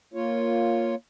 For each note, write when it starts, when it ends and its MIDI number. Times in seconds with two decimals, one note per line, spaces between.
0.14 0.95 58
0.14 0.95 65
0.14 0.95 73